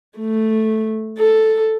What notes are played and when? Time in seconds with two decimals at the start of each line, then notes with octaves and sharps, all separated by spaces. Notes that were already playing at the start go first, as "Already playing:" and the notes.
0.18 A3
1.19 A4